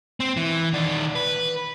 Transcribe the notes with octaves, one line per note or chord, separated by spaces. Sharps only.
C4
E3
D#3 D5
B4